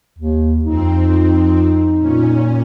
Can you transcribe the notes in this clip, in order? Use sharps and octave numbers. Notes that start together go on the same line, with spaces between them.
D#2
F2 C4 D#4
A#2 C#4